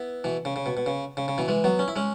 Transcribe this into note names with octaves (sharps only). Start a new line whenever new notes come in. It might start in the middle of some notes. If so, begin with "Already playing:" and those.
Already playing: B3 E4
B2 E3
C#3
C#3
B2
B2
C#3
C#3
C#3
B2 E3
E3 G#3
F#3 B3
C#4
E4
G#3 C#4